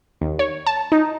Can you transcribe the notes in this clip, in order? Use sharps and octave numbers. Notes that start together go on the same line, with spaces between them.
D#2
C#5
A5
D#4